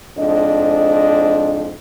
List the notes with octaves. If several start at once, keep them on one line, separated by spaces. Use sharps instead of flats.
F2 G#2 D4 D#5